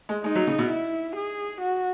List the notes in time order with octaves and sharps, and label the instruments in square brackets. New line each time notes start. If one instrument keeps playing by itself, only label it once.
[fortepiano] G#3
[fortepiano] G#3 [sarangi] D#4
[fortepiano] F#3
C#3
B2
[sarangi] E4
G#4
F#4